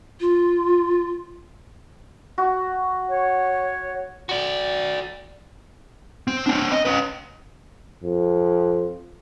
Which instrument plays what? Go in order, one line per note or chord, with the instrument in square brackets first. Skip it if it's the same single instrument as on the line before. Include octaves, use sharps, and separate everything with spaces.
[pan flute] F4
[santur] F#4
[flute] C#5
[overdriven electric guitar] F#4 D5
[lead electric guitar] C4
C4 D4
D#5
C#4 B4
[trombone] F2